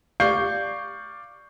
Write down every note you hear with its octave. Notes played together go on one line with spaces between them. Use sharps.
D5 F5 C#6 G6 C7